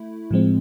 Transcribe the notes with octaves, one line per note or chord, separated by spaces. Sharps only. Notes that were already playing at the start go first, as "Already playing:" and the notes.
Already playing: A3 E4
A2 F3 G#3 C4